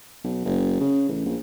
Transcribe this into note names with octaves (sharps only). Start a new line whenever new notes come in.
B1
F#1
C#3
A1
A#1